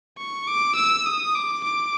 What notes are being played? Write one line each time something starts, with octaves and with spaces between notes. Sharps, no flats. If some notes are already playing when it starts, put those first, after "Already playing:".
C#6
D6
E6
D#6
D6
D6